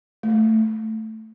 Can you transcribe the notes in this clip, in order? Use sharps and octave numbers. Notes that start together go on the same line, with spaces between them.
A3